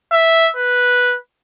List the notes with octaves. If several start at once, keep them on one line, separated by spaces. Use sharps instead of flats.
E5
B4